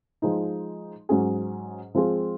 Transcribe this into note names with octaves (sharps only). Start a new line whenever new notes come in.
F3 G#3 D#4
G#2 F#3 C#4 G#4
F3 G#3 C4 F4 G#4